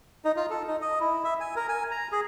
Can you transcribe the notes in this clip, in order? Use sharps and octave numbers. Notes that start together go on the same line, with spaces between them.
D#4
F4
A4
D#4
D#5
E4
E5
G#5
A#4
G#5
A#5
G#4